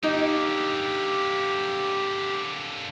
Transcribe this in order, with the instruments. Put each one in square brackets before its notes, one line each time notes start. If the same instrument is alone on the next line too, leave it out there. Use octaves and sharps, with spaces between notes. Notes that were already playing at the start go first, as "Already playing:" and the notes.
[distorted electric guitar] D3 A#3 [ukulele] D#4 [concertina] G4